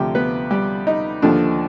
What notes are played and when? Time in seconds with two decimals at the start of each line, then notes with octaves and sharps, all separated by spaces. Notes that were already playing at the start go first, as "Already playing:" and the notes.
Already playing: D2 C3 F3 G4 G5
0.15 B3 B4
0.51 G3 G4
0.87 D#4
1.22 D#2 D3 F3 D4